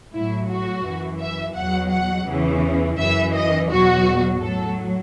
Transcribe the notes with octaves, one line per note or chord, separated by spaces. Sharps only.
A2 F#3 E4
F#4
F#2 E3
E5
E2 B2 F#3 F#5
F#5
E2 C#3 E3
F#2 E3 E5
D#5
E2 B2 F#3 F#4
A2 F#3 A4